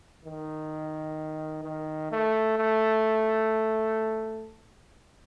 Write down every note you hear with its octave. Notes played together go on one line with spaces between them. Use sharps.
D#3
D#3
A3
A3